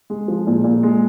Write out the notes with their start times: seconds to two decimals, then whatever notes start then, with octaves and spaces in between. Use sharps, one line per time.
0.10 G#3
0.28 F3
0.47 A#2
0.64 A#2
0.83 G#3